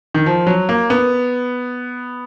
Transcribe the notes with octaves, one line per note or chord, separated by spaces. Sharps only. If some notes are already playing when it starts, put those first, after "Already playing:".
D#3
F3
F#3
A#3
B3